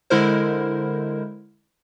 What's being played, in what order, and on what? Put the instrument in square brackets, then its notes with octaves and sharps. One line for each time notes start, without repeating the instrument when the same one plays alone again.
[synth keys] D3 G#3 E4 A#4 C5